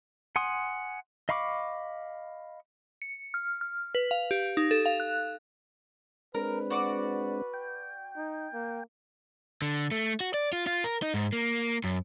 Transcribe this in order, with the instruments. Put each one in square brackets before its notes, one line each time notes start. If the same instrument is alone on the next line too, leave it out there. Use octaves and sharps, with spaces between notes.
[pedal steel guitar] F#5 G#5 C6 D#6
D#5 F5 B5 C#6 D6
[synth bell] C#7
F6
F6
B4
F5
G4
D#4
A4
F5
F#6
[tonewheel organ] G#3 C4 D4 [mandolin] A#4 [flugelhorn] B4
[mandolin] F#4 D5 D6
[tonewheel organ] G5
[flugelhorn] D#4
A#3
[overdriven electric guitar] D3
A3
F#4
D5
F4
F4
A#4
D#4
G#2
A#3
F#2